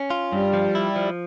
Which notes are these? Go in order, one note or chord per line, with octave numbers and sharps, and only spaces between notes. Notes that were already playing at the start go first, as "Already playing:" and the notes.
Already playing: C#4
F4
G2 G3
F3
E4
F3